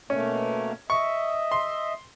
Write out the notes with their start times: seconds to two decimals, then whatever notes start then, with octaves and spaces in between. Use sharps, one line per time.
0.10 B2 A3 A#3 C#4
0.90 D#5 E5 C#6
1.51 C6